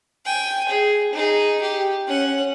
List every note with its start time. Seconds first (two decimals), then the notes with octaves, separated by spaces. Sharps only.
0.26 G5 G#5
0.69 G#4
1.13 D#4 G#4
1.62 G4
2.07 C#4 F#5